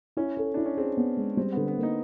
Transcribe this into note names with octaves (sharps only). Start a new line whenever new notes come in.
C#4 E4
A4
D4 E4
C#4
C4 G#4
B3
G#3
G3 C4
D3 B3
B3
A#3
D#4